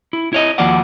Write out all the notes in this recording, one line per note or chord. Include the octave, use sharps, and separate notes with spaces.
E4
E4 C#5 D#5
D#2 F3 A#3 F#4 D5 F#5